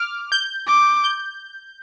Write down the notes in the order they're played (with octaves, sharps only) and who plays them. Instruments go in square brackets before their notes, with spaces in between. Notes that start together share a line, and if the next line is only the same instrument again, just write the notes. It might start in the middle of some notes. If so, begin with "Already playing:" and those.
Already playing: [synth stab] D6 F6
G6
[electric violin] D6
[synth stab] G6